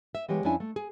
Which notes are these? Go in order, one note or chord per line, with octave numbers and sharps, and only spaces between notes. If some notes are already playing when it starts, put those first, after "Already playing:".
E5
E3 G#3 B3 G4 C#5
F2 C#4 D4 E4 G#5
A3
G#4